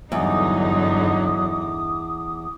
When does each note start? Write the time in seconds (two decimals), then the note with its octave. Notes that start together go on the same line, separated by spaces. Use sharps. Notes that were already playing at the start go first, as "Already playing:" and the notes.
0.12 E2 G2 D3 F#3 D#4 D6 D#6